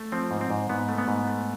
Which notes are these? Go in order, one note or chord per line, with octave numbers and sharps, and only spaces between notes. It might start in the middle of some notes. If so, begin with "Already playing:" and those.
Already playing: A3
F3 C4
G#2
C4
G#2
G#2 B3
A3
B3
G#2
A3